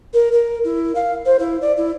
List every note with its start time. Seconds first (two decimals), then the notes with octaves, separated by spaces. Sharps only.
0.13 A#4
0.32 A#4
0.64 E4
0.95 F5
1.25 C5
1.39 E4
1.61 D5
1.77 E4